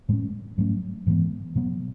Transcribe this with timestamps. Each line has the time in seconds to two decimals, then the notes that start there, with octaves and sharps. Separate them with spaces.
0.09 A2 G#3 C#4
0.58 G#2 F#3 A3 C#4
1.07 G#2 E3 G#3 B3
1.55 B2 F#3 B3